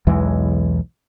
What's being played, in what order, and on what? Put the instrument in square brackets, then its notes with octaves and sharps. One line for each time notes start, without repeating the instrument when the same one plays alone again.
[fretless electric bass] B1 E2 E3 G#3